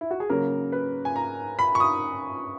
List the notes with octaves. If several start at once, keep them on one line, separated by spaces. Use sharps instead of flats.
E4
F#4
G#4
C#3 F#3 A#3 A#4
B4
G#5
A#5
B5
C#6
D#6